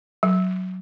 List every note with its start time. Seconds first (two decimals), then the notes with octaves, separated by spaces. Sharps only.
0.23 F#3